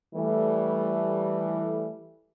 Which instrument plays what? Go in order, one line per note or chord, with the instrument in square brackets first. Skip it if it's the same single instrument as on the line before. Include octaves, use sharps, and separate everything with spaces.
[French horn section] E3 G3 A3